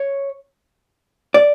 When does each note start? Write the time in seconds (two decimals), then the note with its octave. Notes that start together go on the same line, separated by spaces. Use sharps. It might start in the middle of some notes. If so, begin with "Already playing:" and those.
Already playing: C#5
1.34 D5